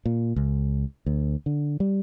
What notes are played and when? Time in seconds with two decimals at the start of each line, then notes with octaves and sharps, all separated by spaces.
0.06 A#2
0.36 C#2
1.06 D2
1.46 D3
1.80 G3